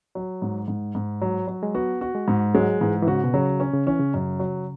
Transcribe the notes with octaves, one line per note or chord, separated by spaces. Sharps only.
F#3
G#2
G#2
G#2
F#3
F#3
G#3
B3 F#4
F#4
G#3
G#2
F#3 G#3
G#2 E3
E3
C#3 F#4
B2
C#3 F#3
C#4
C#3
E3 C#4
C#3
F#2
F#3